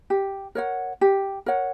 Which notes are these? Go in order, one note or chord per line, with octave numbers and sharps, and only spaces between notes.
G4
A#4 C#5 F#5
G4
A#4 C#5 F#5